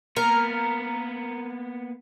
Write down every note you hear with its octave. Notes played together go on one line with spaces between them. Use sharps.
A#3 B3 A#4